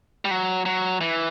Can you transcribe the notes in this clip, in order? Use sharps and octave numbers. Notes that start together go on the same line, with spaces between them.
G3
F#3
F#3
E3